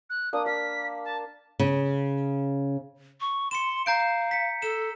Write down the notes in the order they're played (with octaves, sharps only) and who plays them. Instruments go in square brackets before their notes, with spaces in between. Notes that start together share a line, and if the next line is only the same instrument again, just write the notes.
[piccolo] F#6
[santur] A#3 D4 [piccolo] D#6
[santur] F5 [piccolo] B6
[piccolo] A5
[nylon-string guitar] C#3
[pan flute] C#6
[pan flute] C6 [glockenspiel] C#7 E7
[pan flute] F5 [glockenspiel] A#5 G6 D7
[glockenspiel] B6 C#7
[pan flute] A4 [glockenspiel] E7